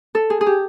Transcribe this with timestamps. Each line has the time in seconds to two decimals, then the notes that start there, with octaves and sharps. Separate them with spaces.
0.15 A4
0.30 G#4
0.41 G#4
0.46 G4